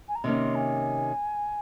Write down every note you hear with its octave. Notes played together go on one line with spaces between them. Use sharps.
G#5
A#5
C3 D#3 A#3 C#4 C6
G#5